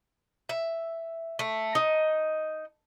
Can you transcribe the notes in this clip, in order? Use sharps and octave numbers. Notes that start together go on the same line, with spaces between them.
E5
A3
D#4